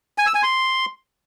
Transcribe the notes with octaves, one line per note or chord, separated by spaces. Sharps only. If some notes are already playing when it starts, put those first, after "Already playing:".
G#5
E6
G#5
C6